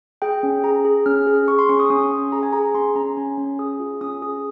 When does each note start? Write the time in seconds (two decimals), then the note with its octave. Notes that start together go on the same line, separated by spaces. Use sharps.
0.22 G#4 G5
0.43 C#4
0.64 G#4 A#5
0.85 G#4
1.06 C#4 F6
1.27 G#4
1.48 G#4 C#6
1.59 C6
1.69 C#4 C#6
1.80 D#6
1.90 C#4 D#6
2.11 C#4
2.32 G#4 A#5
2.43 G#5
2.53 G#4 A#5
2.75 C#4 C6
2.96 C#4 A#5
3.17 C#4 G#5
3.38 C#4
3.59 G#4 D#6
3.80 F4
4.01 C#4 D#6
4.22 G#4 D#6